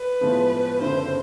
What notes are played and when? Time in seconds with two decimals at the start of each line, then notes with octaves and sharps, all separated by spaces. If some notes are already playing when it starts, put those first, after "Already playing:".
Already playing: B4
0.21 A2 F3 G#3 B3
0.80 F#1 F#2 D3 C5